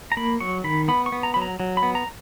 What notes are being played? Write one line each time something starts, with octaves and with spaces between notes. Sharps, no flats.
A#5
A#3 B5
F#3 C#6
D#3 B5
B3 B5
C#6
B3
A#5
F#3 B5
A#5
F#3
B5
B3
A#5